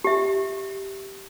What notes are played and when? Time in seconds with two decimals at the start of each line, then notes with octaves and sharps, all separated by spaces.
0.04 G4 E5